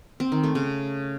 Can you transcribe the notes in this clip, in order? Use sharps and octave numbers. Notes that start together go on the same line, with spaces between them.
C4
D#3
A3
C#3